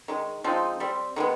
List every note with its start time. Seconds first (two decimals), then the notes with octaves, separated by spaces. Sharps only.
0.08 D#3 G#3
0.44 F3 G#3 C4 D#4
0.80 G3 C4
1.16 D#3 G#3 B3